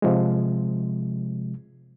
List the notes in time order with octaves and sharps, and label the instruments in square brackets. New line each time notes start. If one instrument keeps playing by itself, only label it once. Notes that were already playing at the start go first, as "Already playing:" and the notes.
[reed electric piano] C3 F3 G#3